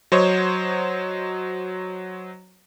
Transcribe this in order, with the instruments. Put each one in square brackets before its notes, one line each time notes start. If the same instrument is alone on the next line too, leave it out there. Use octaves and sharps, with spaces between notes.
[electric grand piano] F#3 C5 C#5 D#5